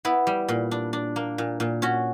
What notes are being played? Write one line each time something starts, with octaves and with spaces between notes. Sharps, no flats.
B3 E4
G3
A#2
D4
D4
A#3
A#2
A#2
C#4 F#4